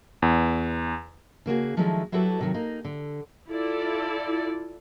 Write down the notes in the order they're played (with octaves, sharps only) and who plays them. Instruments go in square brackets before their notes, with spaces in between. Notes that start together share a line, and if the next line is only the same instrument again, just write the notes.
[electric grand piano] E2
[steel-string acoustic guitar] C#3 A#3 F#4 G#4
D#3 F3 F#3 G#3 A3 E4
F#3 E4 F#4 G4 A4 B4
C3 D#3 F#3
A#3 D#4
D3
[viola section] E4 F4 A4 D5